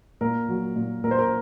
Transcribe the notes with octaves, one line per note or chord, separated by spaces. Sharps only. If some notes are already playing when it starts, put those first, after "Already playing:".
A#2 A#4
F#3
A#2
A#2 A#4
C5
A#4